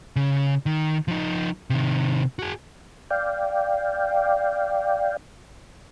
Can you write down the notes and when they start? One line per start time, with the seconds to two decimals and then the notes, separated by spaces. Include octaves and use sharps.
0.16 C#3
0.66 D#3
1.08 F3 D#4
1.70 C3 D#3
2.39 F#4 G#4
3.11 D5 F5 G5